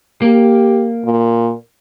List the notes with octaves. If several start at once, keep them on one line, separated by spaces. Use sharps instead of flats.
A#3 G4
A#2